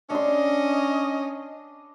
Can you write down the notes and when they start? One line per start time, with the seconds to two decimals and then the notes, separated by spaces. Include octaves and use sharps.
0.10 C#4 D4 D#5 C6